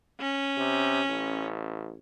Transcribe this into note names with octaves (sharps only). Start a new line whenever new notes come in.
C#4
C3
A1